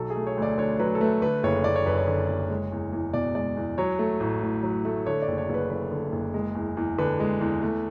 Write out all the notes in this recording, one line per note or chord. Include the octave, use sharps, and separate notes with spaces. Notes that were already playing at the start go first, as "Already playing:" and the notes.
Already playing: B1 F#3 A4
G#4
A3
C#5
D2 D5
D3 C#5
F#3 B4
A4
A3 B4
D3 B4
F#1 C#5
F#1 D5
C#5
F#2 B4
C#5
D3
F#1
G#3
E2
E2
B2 D5
G#3 D5
E2
F#3 C#5
A3
A1
A2
F#3
A3
D3 C#5
D5
F#1
C#5
F#1
B4
F#2 B4
D3
F#1
G#3
E2
E2
D3 B4
G#3
E2
A3